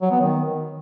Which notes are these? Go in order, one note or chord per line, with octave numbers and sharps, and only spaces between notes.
F#3
B3
D#3